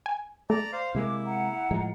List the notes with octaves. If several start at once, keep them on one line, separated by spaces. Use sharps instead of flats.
G#5
A3 D5 A#5
C5 F5
C3 G#3 A#3 E4 D6
F#5 A#5
A2 F3 G#3